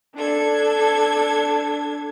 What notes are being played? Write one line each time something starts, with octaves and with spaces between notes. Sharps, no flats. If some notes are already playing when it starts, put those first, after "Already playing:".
D4 A4 G#6